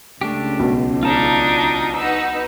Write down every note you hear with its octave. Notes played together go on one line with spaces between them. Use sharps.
C#2 A3 D4 G4
B1
D4 D#4 F4 A5
D#4 F#4 B4 E6